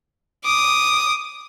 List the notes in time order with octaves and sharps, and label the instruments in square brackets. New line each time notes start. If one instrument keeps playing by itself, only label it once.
[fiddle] D6 D#6